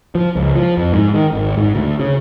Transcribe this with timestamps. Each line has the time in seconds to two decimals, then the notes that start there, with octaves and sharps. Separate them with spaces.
0.15 F3
0.36 C#2
0.56 F3
0.77 F2
0.93 G#2
1.14 D#3
1.32 G#1
1.57 G#2
1.75 D2
2.00 C#3